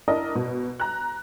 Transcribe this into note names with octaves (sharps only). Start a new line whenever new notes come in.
D4 E4 A#4 D#5
B2
A#5 F#6